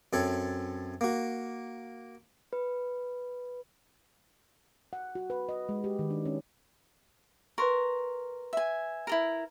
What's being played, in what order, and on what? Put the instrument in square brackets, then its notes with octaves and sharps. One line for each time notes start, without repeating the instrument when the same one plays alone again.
[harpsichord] F#2 C4 A4 C#5
A#3 F#4
[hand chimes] B4
[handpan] F#5
F#4
B4
D#5
G#3
G4
D#3
D4
C#4
[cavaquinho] A#4 [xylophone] B4 C6 C#6
[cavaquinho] E5 G#5
E4 A4 A#4